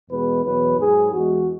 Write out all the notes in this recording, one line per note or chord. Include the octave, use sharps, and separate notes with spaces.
E2 B2 G#3 B4
E2 B2 F#3 B4
G#2 F#3 G#4
E2 E3 G#3 F#4